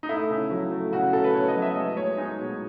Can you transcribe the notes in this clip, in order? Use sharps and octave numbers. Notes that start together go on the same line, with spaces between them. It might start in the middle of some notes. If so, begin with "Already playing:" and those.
D#4
A3 E4
C#3
F#3
A3
C#3 F#4
C#3 A4
B4
C#3 C#5
D#5
F#3
E5
G#3 D#5
G#3 C#5
G#3 D#4
B2